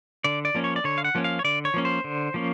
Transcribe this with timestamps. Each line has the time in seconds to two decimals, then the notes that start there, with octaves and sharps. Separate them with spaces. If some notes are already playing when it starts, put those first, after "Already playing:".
0.24 D3 D5
0.45 D5
0.54 F3 A#3 C#4
0.64 C#5
0.76 D5
0.84 D3 C#5
0.98 F5
1.04 F#5
1.15 F3 A#3 C#4
1.24 F5
1.39 C#5
1.44 D3 D5
1.65 C#5
1.74 F3 A#3 C#4
1.85 C5
2.04 D3
2.34 F3 A#3 C#4